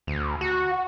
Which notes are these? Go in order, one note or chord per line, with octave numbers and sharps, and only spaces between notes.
D2
F#4